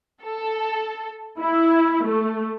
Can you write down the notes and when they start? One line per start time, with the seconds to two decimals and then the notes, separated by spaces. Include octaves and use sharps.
0.23 A4
1.41 E4
2.07 A3